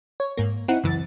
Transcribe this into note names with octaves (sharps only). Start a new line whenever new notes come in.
C#5
G#2 A#3
C4 D#4 E4 F#5
C#2 F#2 E3 A6